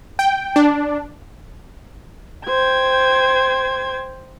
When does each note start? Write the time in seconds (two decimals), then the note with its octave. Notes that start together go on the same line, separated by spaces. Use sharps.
0.19 G5
0.56 D4
2.45 C5 G5 G#6